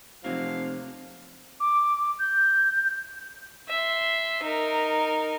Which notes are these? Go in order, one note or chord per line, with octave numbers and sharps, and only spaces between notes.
F1 C3 F3 F#3 A#3 F5
D6
G6
E5 C6
D#4 A#4